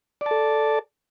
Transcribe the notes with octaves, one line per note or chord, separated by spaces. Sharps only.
A4 D5 A5